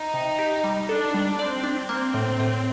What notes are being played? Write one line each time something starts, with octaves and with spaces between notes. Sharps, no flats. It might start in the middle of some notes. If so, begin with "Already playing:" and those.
Already playing: D#4
C3
G4
G3
D4 A4
G3
C4 D5
D4
A#3 C4
A2
A2